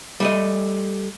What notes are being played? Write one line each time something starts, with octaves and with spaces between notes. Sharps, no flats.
G3 A3 D#5